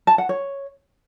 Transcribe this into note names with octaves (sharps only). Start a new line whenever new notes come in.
A5
F#5
C#5